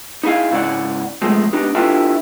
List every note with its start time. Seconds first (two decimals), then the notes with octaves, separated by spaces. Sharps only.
0.23 D#4 E4 G#4 F5
0.51 G#2 C#3 E4 D5 F#5
1.22 B1 F3 G#3 A3
1.53 B3 D4 D#4 G4
1.75 D4 E4 F4 G4 A4 B4